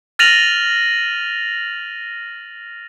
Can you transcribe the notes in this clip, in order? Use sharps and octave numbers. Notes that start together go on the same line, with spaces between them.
F6 A6 A#6 D#7 F7 F#7